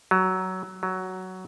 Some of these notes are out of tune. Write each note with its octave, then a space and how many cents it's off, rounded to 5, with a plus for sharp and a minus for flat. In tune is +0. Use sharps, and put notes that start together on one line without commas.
F#3 +15
F#3 +10